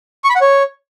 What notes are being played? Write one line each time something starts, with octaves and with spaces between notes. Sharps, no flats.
C#6
B5
F#5
C#5